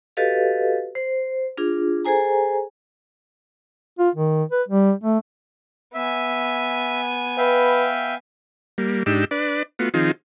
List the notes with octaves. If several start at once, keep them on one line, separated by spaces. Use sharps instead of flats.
F#4 G4 A4 B4 D#5 F5
C5
D4 F4 G#4
G#4 A4 C5 G#5 A#5
F4
D#3
B4
G3
A3
B3 E5 G#5
B4 E5 F5 G5
G3 A#3
G#2 D4 D#4 G4 E6
D4 B4 D5
A3 B3 F4 F#4
D#3 F3 C4 D#4 F4 G#4